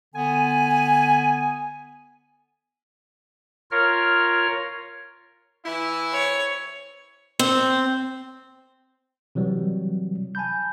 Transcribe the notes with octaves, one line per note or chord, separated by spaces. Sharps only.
D3 B3 G#5
F4 A#4 C#5 F6
E3 E4
C#5
C4
C3 E3 F#3 G3
G#5 A5 B5 G6